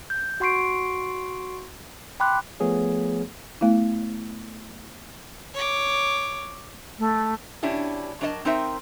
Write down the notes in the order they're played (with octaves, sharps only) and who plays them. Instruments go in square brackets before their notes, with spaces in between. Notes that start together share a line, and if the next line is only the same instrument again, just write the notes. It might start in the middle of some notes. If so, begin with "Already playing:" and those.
[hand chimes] G6
F#4 F#5 C6 C#6 C7 D7
G5 B5 C6 D6 F#6
[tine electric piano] F3 A3 B3 G#4 C#5
[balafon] A3 B3 E4
[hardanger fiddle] C#5 D6
[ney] A3
[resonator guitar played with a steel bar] B2 C#4 D4 E4 G4
F#3 D4 A#4 D5 D#5 A5
C4 D#4 A#4 C5 E5 G5